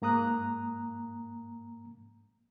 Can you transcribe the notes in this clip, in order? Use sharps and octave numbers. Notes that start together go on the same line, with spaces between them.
G#2 A#3 A#5 D#6 F#6